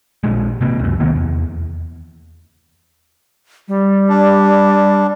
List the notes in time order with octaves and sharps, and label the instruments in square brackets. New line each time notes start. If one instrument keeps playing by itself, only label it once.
[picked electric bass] A#1 A#2 G#3
C3 A#3 C4
C#2 F#2
C3 D#3 A#3 B3
E2
[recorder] G3
[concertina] D4